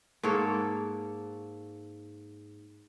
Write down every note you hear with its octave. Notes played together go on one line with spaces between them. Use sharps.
G#2 A#3 A4 C#5